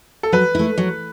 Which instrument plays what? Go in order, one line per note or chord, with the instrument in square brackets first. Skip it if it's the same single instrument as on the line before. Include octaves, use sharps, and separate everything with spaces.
[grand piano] A4
[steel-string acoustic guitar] F#3 [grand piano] B4
[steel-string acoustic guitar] A3 E4
F#3